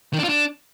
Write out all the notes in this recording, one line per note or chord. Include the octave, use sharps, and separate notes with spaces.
D#3
D4
F4
D4